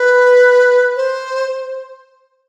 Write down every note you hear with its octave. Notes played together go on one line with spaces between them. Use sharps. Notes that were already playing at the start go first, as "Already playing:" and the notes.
Already playing: B4
C5